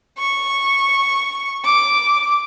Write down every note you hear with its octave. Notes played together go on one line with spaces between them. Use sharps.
C#6
D6